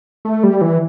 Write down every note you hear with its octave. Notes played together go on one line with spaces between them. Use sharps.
A3
G3
E3